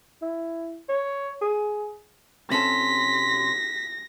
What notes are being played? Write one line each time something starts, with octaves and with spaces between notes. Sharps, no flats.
E4
C#5
G#4
C3 C#4 A4 C6 A#6 B6